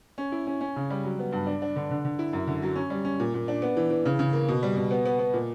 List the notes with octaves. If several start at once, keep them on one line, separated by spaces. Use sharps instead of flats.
C#4
E4
C#4
C#4
C#3
G3
F#3
B3
G2
D4
D4
D3
D3
D3
E4
F#2
D3
F#3
C#4
G3
C#4
A#2
A#2
D4
B3
E3
E3
C#3
C#3
A#3
B2
G3
B2
B3
B3
B3
A#2